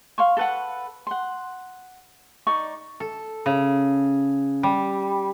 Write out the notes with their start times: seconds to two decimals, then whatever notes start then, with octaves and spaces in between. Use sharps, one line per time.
0.18 F5 C6 C#6
0.37 A4 B4 F#5
1.07 F#5 C6
2.47 D#4 D5 C#6
3.00 A4
3.46 C#3
4.63 G3